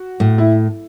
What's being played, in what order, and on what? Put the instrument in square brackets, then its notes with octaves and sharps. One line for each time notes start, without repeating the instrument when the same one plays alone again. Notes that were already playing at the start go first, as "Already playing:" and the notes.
Already playing: [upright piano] F#4
[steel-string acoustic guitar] A2
[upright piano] E4